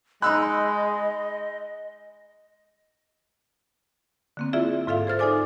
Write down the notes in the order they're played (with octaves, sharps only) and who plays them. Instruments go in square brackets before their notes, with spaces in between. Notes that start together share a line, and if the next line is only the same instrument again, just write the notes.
[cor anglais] G#3 [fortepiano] D#4 E6 F#6 [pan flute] D#5 [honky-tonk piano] B5
[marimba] D3 A#3 C4
E4 F4 G#4 D5 E5
G#2 F4 A4 E5 F5
G#4 C5 F6 A6
D#4 A4 D5 G#5 D6 F6